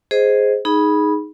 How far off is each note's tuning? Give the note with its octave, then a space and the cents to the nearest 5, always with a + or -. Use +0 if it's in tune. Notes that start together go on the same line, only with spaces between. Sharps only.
G#4 +0 C5 +0 D#5 +0
D#4 +0 G#4 +0 B5 -15